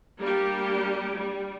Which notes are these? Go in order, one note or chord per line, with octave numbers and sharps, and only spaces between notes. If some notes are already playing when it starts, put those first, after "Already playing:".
G3 A#3 D4 G4
G3